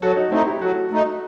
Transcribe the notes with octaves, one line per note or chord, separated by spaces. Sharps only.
F#3 F#4 A4
D#4 F#4
A3 C4 D#4 E4
E4 G4
F#3 F#4 A4
A3 D#4